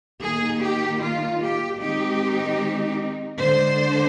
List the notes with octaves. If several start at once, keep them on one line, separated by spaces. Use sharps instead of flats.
D#3 A#3 D#4 G#4
G4
F4
G4
D#3 G#3 C4 D#4 G4
D3 G#3 D4 C5